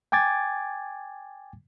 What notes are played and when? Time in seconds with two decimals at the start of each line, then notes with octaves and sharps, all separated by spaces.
0.12 G5 G#5 D6 G#6 A6